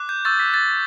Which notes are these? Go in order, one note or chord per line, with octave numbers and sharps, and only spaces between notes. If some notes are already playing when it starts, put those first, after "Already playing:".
Already playing: D6 F#6
G6
C#6 E6 G6 A6
B6
A6